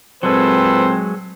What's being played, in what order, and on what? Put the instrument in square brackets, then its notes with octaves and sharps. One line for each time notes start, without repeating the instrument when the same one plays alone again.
[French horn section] A#2 C4 [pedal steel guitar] F#3 G#3 [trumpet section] A4 B4 C5